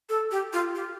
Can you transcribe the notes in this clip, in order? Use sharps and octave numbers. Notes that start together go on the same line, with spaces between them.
A4
G4
F4
G4